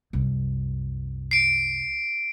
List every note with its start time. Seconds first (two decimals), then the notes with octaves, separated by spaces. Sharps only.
0.13 C2 F#2
1.31 C7 D7